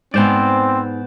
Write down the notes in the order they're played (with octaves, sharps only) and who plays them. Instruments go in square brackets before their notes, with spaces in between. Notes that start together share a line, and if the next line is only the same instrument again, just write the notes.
[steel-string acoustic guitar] G#2 G#5 [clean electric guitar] B3 C5 D5 [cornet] C4